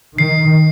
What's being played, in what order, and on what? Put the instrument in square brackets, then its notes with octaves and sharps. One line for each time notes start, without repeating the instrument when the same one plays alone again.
[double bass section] D#3 [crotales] C7